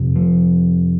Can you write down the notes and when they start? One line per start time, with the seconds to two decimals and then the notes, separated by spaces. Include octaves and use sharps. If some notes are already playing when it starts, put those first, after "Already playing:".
Already playing: F2 C3
0.16 F3